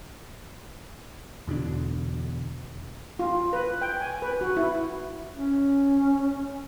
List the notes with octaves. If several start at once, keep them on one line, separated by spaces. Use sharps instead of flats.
E2 B2 D3 D4
F4
B4
G5
G#5
B4
F#4
E4
C#4